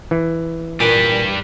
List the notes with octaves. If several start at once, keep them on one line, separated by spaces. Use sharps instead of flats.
E3
A#2 G3 B4 G#5 D6